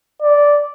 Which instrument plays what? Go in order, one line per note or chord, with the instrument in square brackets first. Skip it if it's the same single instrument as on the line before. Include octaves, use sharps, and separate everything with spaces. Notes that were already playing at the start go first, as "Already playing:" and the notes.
[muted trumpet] D5